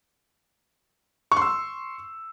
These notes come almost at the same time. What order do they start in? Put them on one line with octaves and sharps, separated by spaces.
C#6 C6 E6